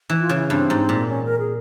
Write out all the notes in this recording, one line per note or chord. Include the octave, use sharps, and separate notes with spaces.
E3
F4
C#3
E4
G2 C4
G#2
A#2
C#4
A#4
G#4